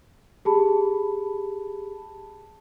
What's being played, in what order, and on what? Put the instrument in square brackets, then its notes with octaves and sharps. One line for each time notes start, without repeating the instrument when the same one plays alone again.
[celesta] G4 G#4 A5 B5